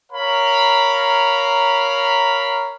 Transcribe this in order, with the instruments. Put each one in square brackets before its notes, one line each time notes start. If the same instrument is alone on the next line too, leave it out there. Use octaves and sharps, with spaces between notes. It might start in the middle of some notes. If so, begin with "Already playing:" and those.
[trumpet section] A#4 C#5 F5 A#5 B5